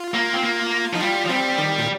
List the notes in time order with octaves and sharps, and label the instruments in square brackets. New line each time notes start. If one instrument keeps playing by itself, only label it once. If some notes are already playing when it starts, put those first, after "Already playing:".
Already playing: [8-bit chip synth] F4
[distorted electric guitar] A#3
C4
A#3
[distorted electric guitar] F3 [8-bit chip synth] D#4
[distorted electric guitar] G3 [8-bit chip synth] F4
[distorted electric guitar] F3
[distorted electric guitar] G3 [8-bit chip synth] C4
[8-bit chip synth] D#3
A#2